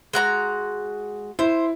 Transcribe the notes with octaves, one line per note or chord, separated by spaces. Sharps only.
G#3 F#4 A#5
E4 C5